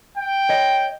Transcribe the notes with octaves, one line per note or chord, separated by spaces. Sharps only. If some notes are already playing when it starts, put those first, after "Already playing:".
G5
C#5 D#5